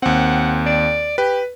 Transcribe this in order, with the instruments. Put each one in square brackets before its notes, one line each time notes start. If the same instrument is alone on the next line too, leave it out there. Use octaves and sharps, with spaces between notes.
[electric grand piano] D#2 C4 [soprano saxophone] F#5
[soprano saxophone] D5
[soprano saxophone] G4 [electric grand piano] B4